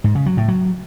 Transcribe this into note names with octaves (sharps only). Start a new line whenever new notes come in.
G#2
C#3
F#3
A2
F#3